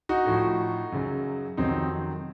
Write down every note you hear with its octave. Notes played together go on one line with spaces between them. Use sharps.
D#4 F#4
A2 F3
F#2 C#3 F#3
F2 C3 D#3 F#3 C4 D#4